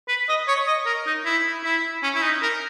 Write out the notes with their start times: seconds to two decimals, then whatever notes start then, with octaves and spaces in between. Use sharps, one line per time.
0.08 B4
0.29 D#5
0.48 C#5
0.67 D#5
0.86 A#4
1.07 D#4
1.25 E4
1.64 E4
2.03 C#4
2.15 E4
2.23 D#4
2.42 A#4